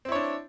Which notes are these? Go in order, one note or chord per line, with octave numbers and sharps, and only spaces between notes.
C4 D4 E4 C#5